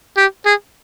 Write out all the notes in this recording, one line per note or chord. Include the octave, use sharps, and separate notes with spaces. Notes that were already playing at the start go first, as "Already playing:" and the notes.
G4
G#4